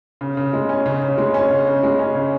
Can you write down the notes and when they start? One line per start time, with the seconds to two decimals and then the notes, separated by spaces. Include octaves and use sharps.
0.21 C#3
0.37 C#3
0.53 G#3
0.69 C#4
0.86 C#3
1.02 C#3
1.18 G#3
1.34 C#4
1.51 C#3
1.67 C#3
1.83 G#3
1.99 C#4
2.15 C#3